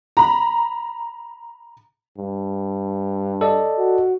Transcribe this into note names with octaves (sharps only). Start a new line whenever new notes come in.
A#5 B5
G2
A4 D5 D#5
F#4